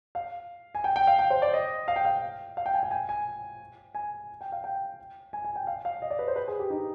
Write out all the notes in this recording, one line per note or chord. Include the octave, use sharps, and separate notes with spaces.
F5
G#5
G5
G5
F5
G5
C5
D5
D#5
F5
G5
F5
F5
G5
G#5
G5
G#5
G#5
G#5
G5
F5
G5
G#5
G#5
G5
F5
F5
D#5
D5
B4
C5
B4
G#4
G4
D#4